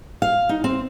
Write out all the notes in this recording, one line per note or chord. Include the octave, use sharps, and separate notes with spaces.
F5
D#4
C4